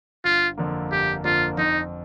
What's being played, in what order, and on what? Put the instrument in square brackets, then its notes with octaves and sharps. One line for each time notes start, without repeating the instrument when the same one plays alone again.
[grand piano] G1 [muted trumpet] F4
[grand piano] F2 D3 F3 A#3
[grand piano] G1 [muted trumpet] G4
[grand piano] F2 D3 F3 A#3 [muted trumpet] F4
[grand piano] F2 [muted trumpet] D#4